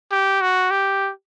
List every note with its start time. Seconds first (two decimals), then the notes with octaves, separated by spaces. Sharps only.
0.12 G4
0.41 F#4
0.71 G4